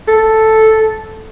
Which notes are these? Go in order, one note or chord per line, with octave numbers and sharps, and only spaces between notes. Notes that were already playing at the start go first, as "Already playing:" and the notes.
A4